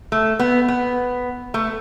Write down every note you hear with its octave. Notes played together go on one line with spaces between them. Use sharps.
A3
B3
B3
A3